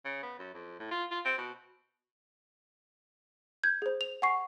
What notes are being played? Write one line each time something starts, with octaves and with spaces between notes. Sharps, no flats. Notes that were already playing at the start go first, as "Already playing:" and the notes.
C#3
B3
F#2
F2
A2
F4
F4
C4
B2
G6 G#6
G#4 C5
F7
F#5 G#5 C#6 C7